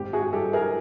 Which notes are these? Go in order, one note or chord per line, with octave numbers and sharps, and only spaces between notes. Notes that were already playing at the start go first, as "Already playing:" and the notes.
Already playing: G#1 G4
F#4 G#4
G2 G4 A4
G#4 A#4